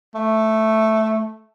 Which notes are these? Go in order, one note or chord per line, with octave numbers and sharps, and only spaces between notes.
A3